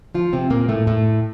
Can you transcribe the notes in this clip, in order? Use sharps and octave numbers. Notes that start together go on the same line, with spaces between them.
F3 F4
C3 C4
A#2 A#3
A2 A3
A2 A3